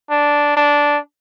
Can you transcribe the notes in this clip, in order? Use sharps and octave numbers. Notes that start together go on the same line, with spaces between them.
D4
D4